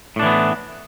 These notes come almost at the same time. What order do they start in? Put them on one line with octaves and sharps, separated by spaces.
A2 D4 E3 B3